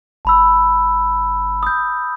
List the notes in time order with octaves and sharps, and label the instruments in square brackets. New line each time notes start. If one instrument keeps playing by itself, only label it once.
[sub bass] G1 [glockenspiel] A5 B5 E6
[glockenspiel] D#6 G6